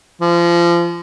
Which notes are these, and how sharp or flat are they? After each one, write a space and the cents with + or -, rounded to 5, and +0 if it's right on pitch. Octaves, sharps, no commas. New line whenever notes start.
F3 -30